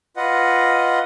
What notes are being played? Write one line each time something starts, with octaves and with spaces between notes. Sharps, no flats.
F4 B4 D#5 F#5